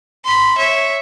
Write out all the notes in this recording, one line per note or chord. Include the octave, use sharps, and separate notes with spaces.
B5 C6
C#5 E5